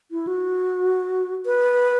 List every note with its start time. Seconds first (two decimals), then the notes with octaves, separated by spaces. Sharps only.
0.11 E4
0.27 F#4
1.46 B4